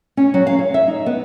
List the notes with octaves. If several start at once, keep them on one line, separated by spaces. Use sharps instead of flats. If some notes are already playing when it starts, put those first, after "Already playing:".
C#4
F#3
F5
C#5
E5
D#4
B3